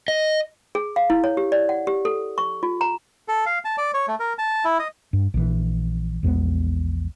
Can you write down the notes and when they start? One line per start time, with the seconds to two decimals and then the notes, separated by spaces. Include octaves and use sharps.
0.08 D#5
0.75 G#4
0.96 F5
1.10 E4
1.24 C#5
1.37 G4
1.52 D5
1.69 F#5
1.87 G4
2.05 A4
2.38 C#6
2.63 F4
2.81 A#5
3.28 A4
3.46 F5
3.65 A5
3.78 D5
3.94 C#5
4.08 A3
4.20 A#4
4.39 A5
4.65 E4
4.79 D#5
5.13 G2
5.34 A#1 E3
6.23 A#1 E2 G#3 B3